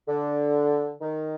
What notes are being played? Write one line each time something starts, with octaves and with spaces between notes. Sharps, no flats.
D3
D#3